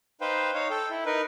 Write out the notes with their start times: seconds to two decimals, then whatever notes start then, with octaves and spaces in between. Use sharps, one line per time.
0.21 D#4 B4 C5 F5 G5
0.54 D#4 C#5 F5
0.70 A4 G5
0.90 E4
1.06 D#4 A#4 B4